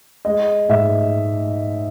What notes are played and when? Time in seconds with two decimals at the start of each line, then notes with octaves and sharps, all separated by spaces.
0.25 G#3 D#5
0.69 G#2 E5